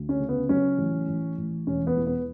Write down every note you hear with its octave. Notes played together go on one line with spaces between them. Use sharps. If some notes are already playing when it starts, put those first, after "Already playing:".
Already playing: D2
C#4
C#3
B3
F#3 C#4
A1
A1
A1
E1 C#4
B3
E2
B3